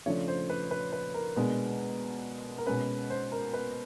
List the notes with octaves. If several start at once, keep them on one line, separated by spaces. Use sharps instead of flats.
C#3 F3 A3 D4 C#5
C5
B4
B4
B4
A#4
B2 G#3 B3 D4
A#4
B2 G#3 C#4 B4
C5
A#4
B4